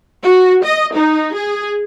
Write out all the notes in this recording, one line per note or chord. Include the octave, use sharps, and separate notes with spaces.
F#4
D#5
D#4
G#4